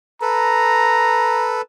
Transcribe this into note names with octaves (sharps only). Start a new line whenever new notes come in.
A4 B4 A#5